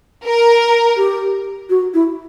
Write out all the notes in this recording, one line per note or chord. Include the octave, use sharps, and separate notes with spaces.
A#4
G4
F#4
E4